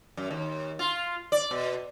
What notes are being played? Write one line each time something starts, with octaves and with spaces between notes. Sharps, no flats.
F#2
D#2
F4
D5
B2